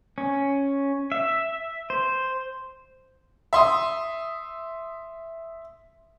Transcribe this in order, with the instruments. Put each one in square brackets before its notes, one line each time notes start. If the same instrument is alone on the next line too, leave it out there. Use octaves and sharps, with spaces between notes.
[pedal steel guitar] C#4
E5
C5
[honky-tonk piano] E5 C6 D#6